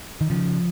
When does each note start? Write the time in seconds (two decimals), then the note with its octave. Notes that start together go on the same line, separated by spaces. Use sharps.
0.21 D#3
0.30 C#3 F3